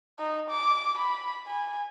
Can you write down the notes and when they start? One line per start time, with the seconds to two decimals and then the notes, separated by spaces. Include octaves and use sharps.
0.19 D#4
0.50 D6
0.98 B5
1.47 G#5